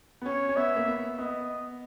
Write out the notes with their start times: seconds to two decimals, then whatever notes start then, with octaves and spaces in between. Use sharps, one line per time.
0.22 B3
0.26 C#4 C#5
0.49 C#4
0.57 B3 E5
0.76 A#3
0.88 B3
1.18 B3 D#5